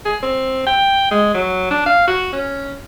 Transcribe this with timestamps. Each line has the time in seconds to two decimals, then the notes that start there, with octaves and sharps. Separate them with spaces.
0.05 G#4
0.23 C4
0.67 G5
1.11 G#3
1.34 F#3
1.71 D4
1.86 F5
2.08 F#4
2.33 C#4